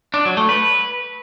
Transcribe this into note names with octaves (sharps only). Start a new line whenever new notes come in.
D4
F#3
A3
B4